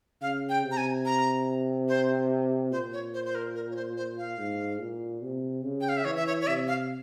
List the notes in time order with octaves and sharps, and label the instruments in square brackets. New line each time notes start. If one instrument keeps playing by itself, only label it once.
[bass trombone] C#3 [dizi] F5
[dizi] G5
[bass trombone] C3
[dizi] A#5
G#5
A#5
C5
[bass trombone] A#2 [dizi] C5
[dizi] C#5
C5
C5
A#4
A#4
C#5
C5
C5
F5
[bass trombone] G#2
A#2
C3
C#3
[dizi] G5
F5
E5
[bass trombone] E3 [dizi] C#5
[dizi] E5
C#5
C#5
[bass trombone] C3 [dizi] E5
[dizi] F5